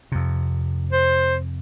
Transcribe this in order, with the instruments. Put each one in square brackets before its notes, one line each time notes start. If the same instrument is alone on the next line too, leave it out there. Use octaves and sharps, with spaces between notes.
[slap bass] F2 C3
[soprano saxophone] C5